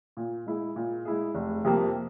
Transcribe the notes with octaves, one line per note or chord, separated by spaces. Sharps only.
A#2
G#3 E4 G#4
A#2
G#3 E4 G#4
F1
F2 C3 G3 A#3